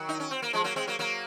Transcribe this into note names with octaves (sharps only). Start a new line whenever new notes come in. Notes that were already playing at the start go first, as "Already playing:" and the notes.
Already playing: D#3 F#3
D#4
C#4
C4
A#3
F3 G#3
F#3 A#3
G#3 C4
F#3 A#3
F#3 A#3